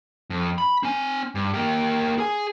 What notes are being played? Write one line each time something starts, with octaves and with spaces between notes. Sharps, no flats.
F2
B5
C4 G#5
G2
A#3 G4
G#4 G#5